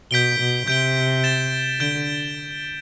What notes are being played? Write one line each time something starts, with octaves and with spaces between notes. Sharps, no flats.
B2 G6 B6 D7 G7
B2
C3 G6 D7 G7
A6 E7 G7
D3 G6 D7 G7